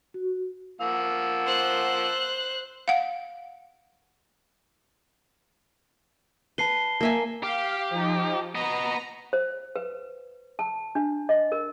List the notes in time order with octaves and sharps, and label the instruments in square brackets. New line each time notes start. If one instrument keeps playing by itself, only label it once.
[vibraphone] F#4
[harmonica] F3 A#3 F#5 [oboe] E6
[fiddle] C5 F#6
[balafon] F5 F#5
[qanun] B4 [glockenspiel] A5 C7 G7
[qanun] A#3 E5 G#5
[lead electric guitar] G4 [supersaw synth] F5
[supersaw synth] F3 D#4
[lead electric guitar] B3 D#5 [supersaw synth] A#5
[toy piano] C5
B4
A5
D4
D#5
A#4